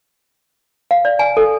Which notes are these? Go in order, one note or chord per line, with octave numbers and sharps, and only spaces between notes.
F5
D5
G#5
A4